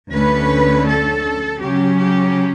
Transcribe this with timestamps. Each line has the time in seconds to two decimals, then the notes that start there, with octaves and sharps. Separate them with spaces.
0.12 D2 D3 A3 C#4 B4
0.87 A4
1.60 C#3 F#3 C#4 G4
1.98 G4